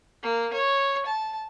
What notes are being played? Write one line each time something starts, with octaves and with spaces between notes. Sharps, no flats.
A#3
C#5
A5